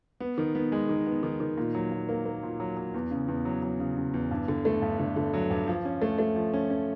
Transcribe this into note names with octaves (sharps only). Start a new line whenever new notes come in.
B3
D#3
B3
G#3
D#3
B3
D#3
D#3
A#2
F#3
A#2
A#3
A#3
A#2
F#3
F#3
E2
C#3
E2
F#3
F#3
C#3
C#3
E2
G2
D3
A3
G2
D3
D3
F#3
G2
F3
C#4
A3
A3
F3
C#4
C#4